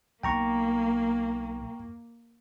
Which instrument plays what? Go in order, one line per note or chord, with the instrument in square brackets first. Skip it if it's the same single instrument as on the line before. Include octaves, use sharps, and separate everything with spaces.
[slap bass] B1 [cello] A#3 [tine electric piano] G5 A#5 C#6